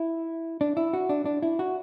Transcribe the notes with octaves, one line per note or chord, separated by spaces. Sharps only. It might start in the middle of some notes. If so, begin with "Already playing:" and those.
Already playing: E4
D4
E4
F#4
D4
D4
E4
F#4